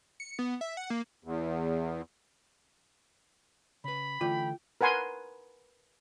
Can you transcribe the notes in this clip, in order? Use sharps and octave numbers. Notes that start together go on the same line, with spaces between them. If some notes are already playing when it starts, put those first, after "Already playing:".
C#7
B3
E5
F#5
A#3
E2
C#3 B4 B5
D3 E3 A3 F4 G5
A#4 B4 F#5 G#5 C6